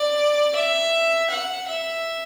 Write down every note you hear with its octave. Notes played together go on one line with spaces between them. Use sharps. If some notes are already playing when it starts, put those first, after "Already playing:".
Already playing: D5
E5
F#5
E5